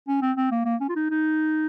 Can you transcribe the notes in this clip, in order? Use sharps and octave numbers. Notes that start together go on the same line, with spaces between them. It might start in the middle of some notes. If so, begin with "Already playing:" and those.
C#4
C4
C4
A#3
A#3
C#4
F4
D#4
D#4